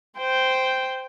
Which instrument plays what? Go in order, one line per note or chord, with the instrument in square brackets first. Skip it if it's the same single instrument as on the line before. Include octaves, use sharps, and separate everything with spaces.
[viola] C5 G5